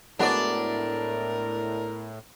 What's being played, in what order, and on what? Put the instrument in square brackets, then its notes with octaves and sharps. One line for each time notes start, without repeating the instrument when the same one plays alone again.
[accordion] A2 [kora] G#3 B3 F#4 [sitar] D4 D5 [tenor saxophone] A#4